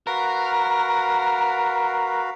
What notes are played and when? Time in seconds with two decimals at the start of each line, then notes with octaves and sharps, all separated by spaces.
0.07 F#4 A#4 B4 F5